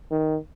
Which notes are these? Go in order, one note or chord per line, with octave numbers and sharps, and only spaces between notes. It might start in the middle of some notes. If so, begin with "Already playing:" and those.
D#3